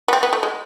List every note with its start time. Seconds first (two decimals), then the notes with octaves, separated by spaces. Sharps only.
0.08 B3
0.13 C4
0.23 B3
0.33 A3
0.43 G#3